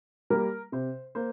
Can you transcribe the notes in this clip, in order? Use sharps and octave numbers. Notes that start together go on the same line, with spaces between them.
G3 A#3 A#4
C3 C5
A#3 C5